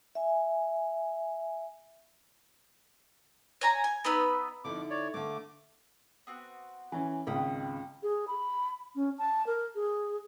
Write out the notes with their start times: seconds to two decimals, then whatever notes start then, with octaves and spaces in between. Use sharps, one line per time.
0.15 E5 G#5
3.61 C#5 G#5 A#5
3.84 G#5
4.04 B3 D#4 B4 E6
4.64 F2 D3 D#4 E4 D6
4.90 C#5 D5
5.14 D3 A3 A#3 D6
6.27 B3 C4 F#4
6.92 E3 C#4
7.27 G#1 C#2 G5 B5 D#6
8.03 G#4
8.28 B5
8.95 C#4
9.18 A5
9.46 A#4
9.75 G#4